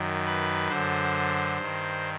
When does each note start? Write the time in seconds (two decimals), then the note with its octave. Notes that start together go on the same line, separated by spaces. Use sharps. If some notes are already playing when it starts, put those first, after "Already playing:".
Already playing: F#2 D#3
0.25 B4
0.69 F#2 D3 C5
1.59 G2 D#3